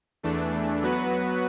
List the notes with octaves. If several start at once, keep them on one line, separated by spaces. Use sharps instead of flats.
E2 E3 A3 D4
F#3 B3 F#4 B4